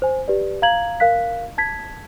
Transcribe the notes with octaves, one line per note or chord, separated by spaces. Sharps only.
C5 G#5
G4 B4 D5
F5 A#5 G#6 F#7
A#4 F5 F#6 B6
A5 G#6 B6